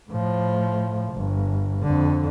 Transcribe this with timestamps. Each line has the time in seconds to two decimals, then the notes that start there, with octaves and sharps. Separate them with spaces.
0.10 A2 F3
1.13 G1
1.83 F2 D3